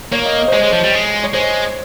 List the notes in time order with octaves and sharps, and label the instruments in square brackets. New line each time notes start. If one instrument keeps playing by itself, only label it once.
[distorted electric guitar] A#3 [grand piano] C#5
[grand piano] D#5
D#5
C5
[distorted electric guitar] G#3 [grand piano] C#5
[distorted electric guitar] G#3
F3
G3
G#3
[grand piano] C#5
[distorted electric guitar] G#3 [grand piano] C5